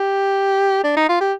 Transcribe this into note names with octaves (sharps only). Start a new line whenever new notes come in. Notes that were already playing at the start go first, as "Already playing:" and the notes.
Already playing: G4
D4
D#4
F4
G4